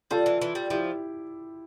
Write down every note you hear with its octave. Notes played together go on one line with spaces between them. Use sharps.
G3 F4 A4
E3
E3
G3
F3 E4 G4